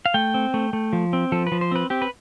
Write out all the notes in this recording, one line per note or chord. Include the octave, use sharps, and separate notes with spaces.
F5
A3 G5
C4
A3
A3
F3
C4
F3 A4
B4
F3
C5
C4 B4
C4 G4
B4